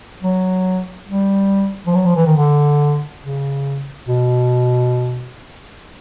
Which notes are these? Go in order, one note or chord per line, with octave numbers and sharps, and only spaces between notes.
F#3
G3
F3
F#3
F3
E3
D#3
D3
C#3
B2